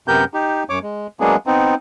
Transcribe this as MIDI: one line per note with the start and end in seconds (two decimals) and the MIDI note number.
0.08 0.24 42
0.08 0.24 48
0.08 0.24 59
0.08 0.24 67
0.08 0.24 70
0.08 0.24 91
0.34 0.63 63
0.34 0.63 67
0.69 0.79 42
0.69 0.79 73
0.69 0.79 86
0.83 1.07 56
1.20 1.36 54
1.20 1.36 56
1.20 1.36 58
1.20 1.36 59
1.20 1.36 62
1.20 1.36 68
1.47 1.75 59
1.47 1.75 60
1.47 1.75 63